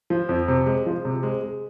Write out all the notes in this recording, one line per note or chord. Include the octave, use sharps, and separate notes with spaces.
F3
F2
C3
G#3
F3
C3
G#3
G#3